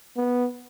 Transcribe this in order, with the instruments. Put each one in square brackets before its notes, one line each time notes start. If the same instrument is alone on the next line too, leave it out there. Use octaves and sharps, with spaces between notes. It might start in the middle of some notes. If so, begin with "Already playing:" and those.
[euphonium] B3